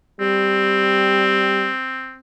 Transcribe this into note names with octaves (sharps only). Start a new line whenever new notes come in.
G3 C4